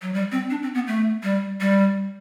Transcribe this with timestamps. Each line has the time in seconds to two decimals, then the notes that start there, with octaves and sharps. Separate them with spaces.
0.02 F#3
0.14 G3
0.32 C4
0.50 D4
0.62 C4
0.75 B3
0.87 A3
1.23 G3
1.61 G3